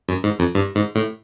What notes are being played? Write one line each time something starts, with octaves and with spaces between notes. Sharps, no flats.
F#2
G#2
F2
G2
G#2
A2